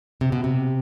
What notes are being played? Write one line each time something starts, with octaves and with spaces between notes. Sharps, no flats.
C3
B2
C3